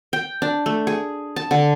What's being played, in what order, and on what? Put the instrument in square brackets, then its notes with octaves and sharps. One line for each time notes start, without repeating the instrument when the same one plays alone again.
[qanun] G5
D4
A3
G#4
A5
D3